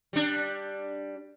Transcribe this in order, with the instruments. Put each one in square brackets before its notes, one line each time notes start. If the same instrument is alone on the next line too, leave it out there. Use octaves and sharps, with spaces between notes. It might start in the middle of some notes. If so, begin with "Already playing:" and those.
[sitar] G3 D4